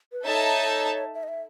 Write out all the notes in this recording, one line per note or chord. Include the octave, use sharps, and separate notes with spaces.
B4
D#4 A4 C#5 E5 A5
E5
D#5
E5